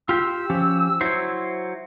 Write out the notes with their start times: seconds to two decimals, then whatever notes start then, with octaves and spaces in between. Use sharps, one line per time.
0.09 F4 G4 E6
0.50 F3 C#4 G4
1.01 F#3 E4 C5